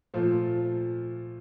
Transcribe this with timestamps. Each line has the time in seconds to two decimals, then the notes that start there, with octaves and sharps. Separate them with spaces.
0.14 A#2 F3 A3